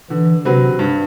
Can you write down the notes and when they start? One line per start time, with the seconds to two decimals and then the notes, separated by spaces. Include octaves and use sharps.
0.10 D3 E3
0.45 C3 F#3 C4 F#4 B4
0.79 G2